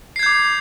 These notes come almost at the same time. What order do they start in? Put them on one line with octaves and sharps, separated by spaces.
C7 G#6 G6 D6